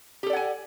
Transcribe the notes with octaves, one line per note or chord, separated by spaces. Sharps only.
G4 A4 D5 F#5 G#5